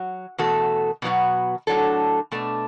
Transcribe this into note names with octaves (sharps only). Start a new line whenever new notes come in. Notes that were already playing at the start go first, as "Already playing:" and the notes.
Already playing: F#3
E2 B2 A3 F#4 A4
B2 F#3 B3 F#4
A2 F#3 D4 A4
B2 A3 D4